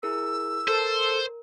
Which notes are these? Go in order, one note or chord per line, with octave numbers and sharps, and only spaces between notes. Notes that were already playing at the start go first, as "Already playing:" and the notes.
E4 G#4 A#4 E6
A4 A#4 C5